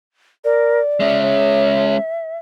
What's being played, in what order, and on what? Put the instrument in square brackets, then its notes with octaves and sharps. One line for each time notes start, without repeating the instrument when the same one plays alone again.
[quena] A#4 [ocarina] D5
[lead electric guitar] G#3 C#4 [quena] E5
[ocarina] C#5